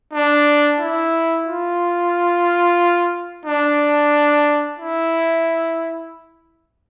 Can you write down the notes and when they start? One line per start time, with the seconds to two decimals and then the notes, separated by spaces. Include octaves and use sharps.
0.14 D4
0.80 E4
1.46 F4
3.46 D4
4.79 E4